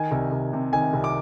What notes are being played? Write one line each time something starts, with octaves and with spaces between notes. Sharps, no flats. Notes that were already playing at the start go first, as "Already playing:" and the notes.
Already playing: D#3 G#5
C2
C2
C3
D#3 G#5
C2
D6